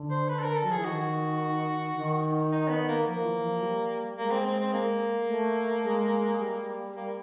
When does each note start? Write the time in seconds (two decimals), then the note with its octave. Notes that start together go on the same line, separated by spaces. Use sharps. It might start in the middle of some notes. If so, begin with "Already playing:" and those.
Already playing: D3
0.10 C5
0.29 B4
0.39 A4
0.43 A#4
0.57 A4
0.64 F#3
0.70 F3 G#4
0.78 E3
0.85 D#3 F#4
1.96 D#3
2.52 D#4
2.69 B3
2.88 A#3
3.06 F3 A#3
3.25 E3
3.44 F3
3.62 G3
4.17 G#3 A#3
4.31 C4
4.46 C4
4.59 C4
4.73 A#3
5.28 A3
5.84 G#3
6.39 G3
6.95 A#3